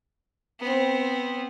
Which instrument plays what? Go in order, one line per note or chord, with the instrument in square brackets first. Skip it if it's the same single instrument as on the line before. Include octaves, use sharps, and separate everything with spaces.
[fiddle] B3 C4